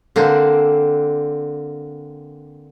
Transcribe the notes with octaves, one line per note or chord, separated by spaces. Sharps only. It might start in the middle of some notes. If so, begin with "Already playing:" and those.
D3 A#3 C4 D4